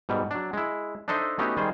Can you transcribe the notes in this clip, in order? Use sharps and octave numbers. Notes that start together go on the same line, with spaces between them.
G#2 B2 G3
F#3 D4
G#3 E4
D4 D#4 A4 C5 D#5 E5
A3 B3 C#4 D#4 F#4 G4
D#3 G3 G#4 C5